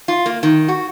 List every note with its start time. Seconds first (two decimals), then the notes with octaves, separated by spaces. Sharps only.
0.08 F4
0.26 A#3
0.43 D#3
0.68 F#4